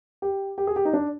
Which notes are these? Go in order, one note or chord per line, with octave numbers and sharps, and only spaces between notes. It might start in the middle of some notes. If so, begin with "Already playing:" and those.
G4
G4
G#4
G4
D#4
D4